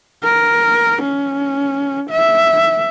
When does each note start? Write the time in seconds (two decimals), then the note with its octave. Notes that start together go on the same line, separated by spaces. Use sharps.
0.23 A#4
1.03 C#4
2.11 E5